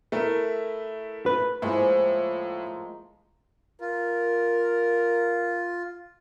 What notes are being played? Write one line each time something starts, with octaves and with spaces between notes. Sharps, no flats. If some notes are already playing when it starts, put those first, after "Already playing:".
A3 E4 A#4
B4
A2 F3 G#3 A#3
F4 A#4